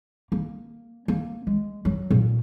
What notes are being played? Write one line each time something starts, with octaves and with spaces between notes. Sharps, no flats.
A#3
A#3
G#3
F#3
A#2